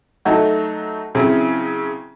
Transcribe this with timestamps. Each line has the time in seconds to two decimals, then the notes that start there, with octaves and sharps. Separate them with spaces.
0.25 F#3 A3 D#4 F#4 A4
1.15 C#3 F#3 C4 E4 G#4